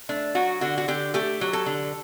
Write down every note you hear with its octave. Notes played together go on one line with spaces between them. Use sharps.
A3 D4
F#3 F#4
D3 F#4
F#4
D3 G4
A3 G4
F#3
A4
D3